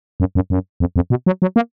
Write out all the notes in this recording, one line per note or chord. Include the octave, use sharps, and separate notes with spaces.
F#2
F#2
F#2
F2
F2
B2
F#3
F#3
A#3